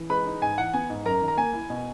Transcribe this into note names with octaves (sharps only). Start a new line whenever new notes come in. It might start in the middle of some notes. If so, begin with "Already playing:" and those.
Already playing: E3
G#3 B4 B5
D#4
G#2 G#5
E3 F#5
B3 G#5
G#2
F#2 A#4 A#5
D#3
A#5
A#3 G#5
E4
B2